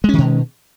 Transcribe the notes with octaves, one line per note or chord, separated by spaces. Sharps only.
B2 D#3 G#3 C#4